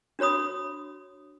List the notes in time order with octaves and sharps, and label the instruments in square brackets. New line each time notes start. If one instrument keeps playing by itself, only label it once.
[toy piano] D4 F#4 C#5 B5 D#6